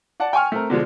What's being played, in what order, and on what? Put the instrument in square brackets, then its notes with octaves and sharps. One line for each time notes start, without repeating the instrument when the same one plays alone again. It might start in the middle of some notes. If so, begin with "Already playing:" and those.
[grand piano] D5 F#5 A5
G5 G#5 C#6 F6
A3 C4 A#4
B2 D3 F3 G#3